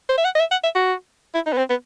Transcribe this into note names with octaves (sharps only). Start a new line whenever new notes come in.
C5
E5
F#5
D#5
E5
F#5
E5
F#4
E4
D#4
B3
C4
B3